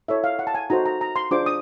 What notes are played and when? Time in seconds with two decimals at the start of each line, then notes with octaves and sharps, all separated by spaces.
0.08 E4 A4 C#5 E5
0.24 F5
0.39 F#5
0.47 A5
0.55 G#5
0.70 D#4 F#4 A4 C5 A#5
0.86 A#5
1.01 A#5
1.16 C6
1.31 D4 F4 G#4 C5 D6
1.46 D#6